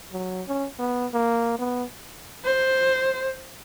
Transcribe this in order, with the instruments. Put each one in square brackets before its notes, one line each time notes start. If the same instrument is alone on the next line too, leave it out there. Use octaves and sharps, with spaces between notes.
[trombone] F#3
C#4
B3
A#3
B3
[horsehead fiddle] C5